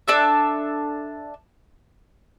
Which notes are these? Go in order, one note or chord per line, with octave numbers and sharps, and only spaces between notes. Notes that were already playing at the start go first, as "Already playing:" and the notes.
D4 A4 E5 A5